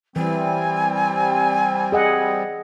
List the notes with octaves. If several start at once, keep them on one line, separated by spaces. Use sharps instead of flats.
E3 G3 C4 G#5
G#4 D#5 F#5